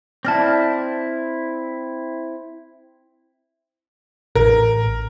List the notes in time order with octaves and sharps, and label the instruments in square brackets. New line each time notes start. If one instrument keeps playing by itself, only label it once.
[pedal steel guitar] C4 E4 [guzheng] D5 [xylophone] A5 F6 A#6
[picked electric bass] A1 [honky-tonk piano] A#4